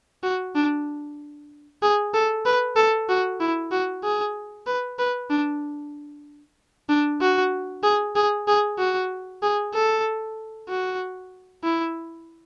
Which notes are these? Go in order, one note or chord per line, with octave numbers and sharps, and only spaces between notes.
F#4
D4
G#4
A4
B4
A4
F#4
E4
F#4
G#4
B4
B4
D4
D4
F#4
G#4
G#4
G#4
F#4
G#4
A4
F#4
E4